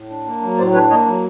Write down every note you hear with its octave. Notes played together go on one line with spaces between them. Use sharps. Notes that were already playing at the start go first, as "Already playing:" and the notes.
Already playing: A2
D4
A#3
F#3
A2 C5 D5
D4 B4 C#5
A#3 C#5 D#5
F#3